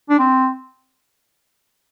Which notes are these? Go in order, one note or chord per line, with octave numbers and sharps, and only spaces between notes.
D4
C4